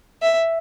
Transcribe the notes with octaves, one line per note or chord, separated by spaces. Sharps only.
E5